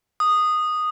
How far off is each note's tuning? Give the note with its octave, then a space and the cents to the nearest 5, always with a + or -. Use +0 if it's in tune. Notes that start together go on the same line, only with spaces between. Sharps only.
D#6 -10